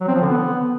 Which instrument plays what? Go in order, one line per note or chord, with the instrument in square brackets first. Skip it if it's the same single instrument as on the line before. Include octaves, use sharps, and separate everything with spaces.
[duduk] F#3
C4
F3
D3
B3